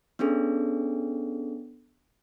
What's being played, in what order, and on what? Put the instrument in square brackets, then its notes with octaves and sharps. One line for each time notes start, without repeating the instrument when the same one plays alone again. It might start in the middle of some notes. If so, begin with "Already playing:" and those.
[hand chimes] B3 C#4 D4 G#4 A4